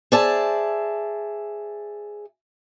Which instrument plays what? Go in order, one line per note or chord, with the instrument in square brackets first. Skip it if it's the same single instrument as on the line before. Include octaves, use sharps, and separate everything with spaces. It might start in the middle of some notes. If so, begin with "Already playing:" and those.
[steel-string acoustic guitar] G#4 C5 D5 E5 A5